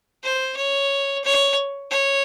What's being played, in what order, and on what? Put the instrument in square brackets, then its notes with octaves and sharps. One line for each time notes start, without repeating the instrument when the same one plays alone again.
[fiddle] C5
C#5
C#5
C#5